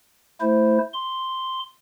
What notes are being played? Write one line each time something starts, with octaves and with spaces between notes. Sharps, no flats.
A3 E4 C5
C6